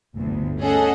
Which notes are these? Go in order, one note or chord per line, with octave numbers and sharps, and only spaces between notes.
G1 D2
C#4 G#4 A4 D#5 F#5